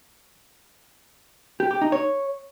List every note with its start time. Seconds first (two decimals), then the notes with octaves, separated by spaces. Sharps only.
1.60 G4
1.71 G4
1.81 D#4
1.92 C#5